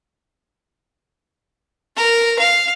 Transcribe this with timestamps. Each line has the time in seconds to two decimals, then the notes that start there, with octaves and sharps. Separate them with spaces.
1.96 A#4
2.39 F5